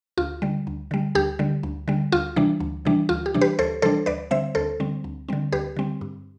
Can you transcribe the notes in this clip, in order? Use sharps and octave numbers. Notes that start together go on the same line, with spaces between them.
D2 F4
D3 G3
D2
D3 G3
D2 G4
D3 G3
D2
D3 G3
D2 F4
C3 E3 G3 D4
D2
C3 E3 G3 D4
D2 F4
G4
C3 E3 G3 D4
G4 B4
D2 A4 C5
C3 E3 G3 D4 A4 C5
D2 B4 D5
D3 G3 C4 C5 E5
D2 A4 C5
D3 G3 C4
D2
D3 G3 C4
D2 G4 B4
D3 G3 C4
G2